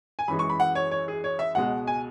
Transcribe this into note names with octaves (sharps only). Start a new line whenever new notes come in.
G#5
F#2 E3 G#3 B5
C#6
B5
F#5
C#5
C#5
G#4
C#5
E5
C#2 B2 G#3 F#5
G#5